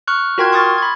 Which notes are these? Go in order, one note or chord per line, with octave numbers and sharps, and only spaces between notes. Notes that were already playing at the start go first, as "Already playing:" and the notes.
C#6 F6 F#6
F4 F#4 A#4 G5 C6 G#6
C6 C#6 D#6 F6 A6
B5 G#6